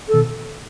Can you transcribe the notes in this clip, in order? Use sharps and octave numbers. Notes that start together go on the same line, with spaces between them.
A4
B2 D#3